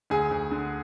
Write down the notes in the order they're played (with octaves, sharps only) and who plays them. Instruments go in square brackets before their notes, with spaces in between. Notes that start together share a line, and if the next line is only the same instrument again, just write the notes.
[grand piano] D2 G#4 G#5
D2
D3